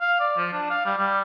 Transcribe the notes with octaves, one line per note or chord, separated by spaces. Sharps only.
F5
D5
F3
D4
F5
G3
G3